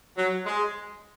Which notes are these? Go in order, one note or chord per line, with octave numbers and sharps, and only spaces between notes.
F#3
G#3